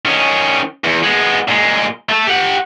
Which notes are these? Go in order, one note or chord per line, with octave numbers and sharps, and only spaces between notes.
D#3 C#4
E2
G#3 B3
A#2 G#3
A3 A4
G4 F#5